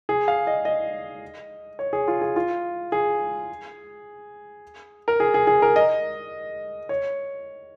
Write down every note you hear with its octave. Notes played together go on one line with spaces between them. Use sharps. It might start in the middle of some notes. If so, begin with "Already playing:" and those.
G#4
F5
D#5
D#5
C#5
G#4
F4
G#4
F4
G#4
A#4
G#4
G#4
G#4
A#4
D#5
C#5